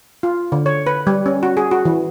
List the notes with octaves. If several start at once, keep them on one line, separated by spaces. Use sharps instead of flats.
F4
D3
C#5
B4
G3
C#4
F#4
G#4
F#4
E3